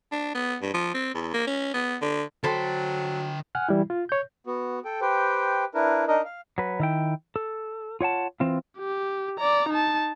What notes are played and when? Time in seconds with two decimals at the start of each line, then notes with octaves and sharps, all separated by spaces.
0.12 D4
0.35 B3
0.62 G2
0.74 F3
0.94 C4
1.15 E2
1.34 A#3
1.47 C#4
1.74 B3
2.02 D3
2.43 D3 F#3 A4 C5 G5 B5
3.55 F#5 G#5 F6 F#6
3.69 E3 G3 E4
3.90 F4
4.09 C#5 G6
4.47 B3 F#4
4.85 A4 G5
5.01 G4 B4 C5 G5
5.74 D4 E4 A#4 B4
6.08 D4 D#4 A#4 D#5
6.25 F5
6.58 F#3 B4
6.80 D#3 E4 G5
7.36 A4
8.01 F4 C#5 F#5 A5
8.40 E3 C4 F4
8.78 G4
9.39 D5 A#5
9.69 D#4 A5